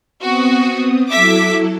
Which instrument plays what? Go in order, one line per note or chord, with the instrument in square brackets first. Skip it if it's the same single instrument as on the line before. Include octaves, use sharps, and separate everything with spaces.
[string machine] B3 C4 D#6 [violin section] F#4
[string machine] F#3 E4 A4 [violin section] E5 D6 B6